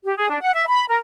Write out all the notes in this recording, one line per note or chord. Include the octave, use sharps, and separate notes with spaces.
G4
G#4
D4
F#5
E5
B5
A#4